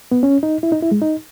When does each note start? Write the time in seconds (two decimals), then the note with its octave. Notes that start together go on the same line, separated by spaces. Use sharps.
0.12 B3
0.23 C#4
0.43 D#4
0.63 E4
0.72 D#4
0.82 E4
0.92 G#3
1.02 D#4